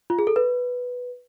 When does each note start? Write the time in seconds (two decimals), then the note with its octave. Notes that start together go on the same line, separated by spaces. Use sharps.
0.10 F4
0.19 G#4
0.27 A4
0.36 B4